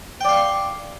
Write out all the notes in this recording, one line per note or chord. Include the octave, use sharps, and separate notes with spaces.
D5 F5 G5 C6 C#6